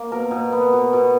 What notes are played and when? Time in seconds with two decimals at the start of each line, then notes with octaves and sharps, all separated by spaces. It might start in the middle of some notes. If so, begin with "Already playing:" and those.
Already playing: A#3
0.11 B2 A#4
0.31 B2
0.52 B3
0.73 B2
0.93 B2